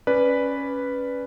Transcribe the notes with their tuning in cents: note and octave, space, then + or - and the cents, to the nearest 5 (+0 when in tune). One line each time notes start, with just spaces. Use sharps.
C#4 +0 B4 +0 D5 +0